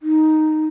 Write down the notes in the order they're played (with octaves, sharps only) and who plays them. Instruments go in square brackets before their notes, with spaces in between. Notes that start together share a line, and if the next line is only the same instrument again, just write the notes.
[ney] D#4